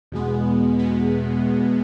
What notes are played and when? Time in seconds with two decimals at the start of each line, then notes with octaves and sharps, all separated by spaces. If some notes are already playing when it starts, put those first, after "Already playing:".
0.12 E2 B2 G#3 B3
0.79 B2 G#3 B3